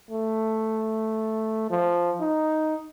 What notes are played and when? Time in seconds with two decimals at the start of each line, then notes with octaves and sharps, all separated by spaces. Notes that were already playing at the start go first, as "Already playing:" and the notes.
0.10 A3
1.70 F3
2.20 D#4